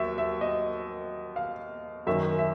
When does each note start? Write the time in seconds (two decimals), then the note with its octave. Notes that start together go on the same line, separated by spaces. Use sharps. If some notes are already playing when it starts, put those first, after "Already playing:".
Already playing: D#2 F#3 E5
0.18 E5
0.41 D#5
1.36 F5
2.07 F#2 D#3 F#3 E5
2.39 E5